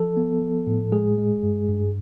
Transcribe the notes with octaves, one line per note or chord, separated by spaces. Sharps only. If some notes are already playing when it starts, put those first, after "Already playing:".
Already playing: F3 A4
B3
F3
A2
G#3 G#4
G#3
G2
G2